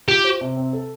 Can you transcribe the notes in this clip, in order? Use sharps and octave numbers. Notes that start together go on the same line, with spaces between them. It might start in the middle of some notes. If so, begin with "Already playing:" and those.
F4 G4
C5
C3
C4
A4